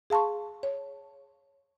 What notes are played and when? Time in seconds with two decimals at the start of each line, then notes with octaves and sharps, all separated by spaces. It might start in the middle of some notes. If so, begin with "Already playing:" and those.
0.10 G#4 F5 A5 C6 C#6
0.63 C#5